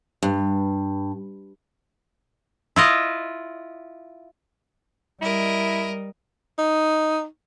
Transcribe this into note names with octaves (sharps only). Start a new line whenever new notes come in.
G2
E4 F4 D#5
G3 E4 A#4 D#5
D#4